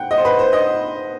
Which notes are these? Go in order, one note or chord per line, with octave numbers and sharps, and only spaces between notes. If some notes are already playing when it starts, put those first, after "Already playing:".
Already playing: F#5 G5
D#5
C5
B4
C5
D#5